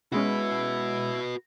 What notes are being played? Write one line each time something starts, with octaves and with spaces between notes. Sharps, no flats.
B2 G#3 C#4 E4 F#4 B4